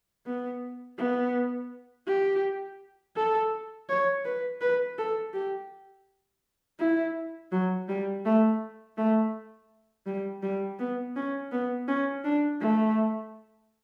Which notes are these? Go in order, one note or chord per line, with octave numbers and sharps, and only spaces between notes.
B3
B3
G4
A4
C#5
B4
B4
A4
G4
E4
F#3
G3
A3
A3
G3
G3
B3
C#4
B3
C#4
D4
A3